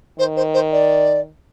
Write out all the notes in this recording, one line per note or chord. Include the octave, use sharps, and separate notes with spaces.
D#3 C5
C5
C5
D5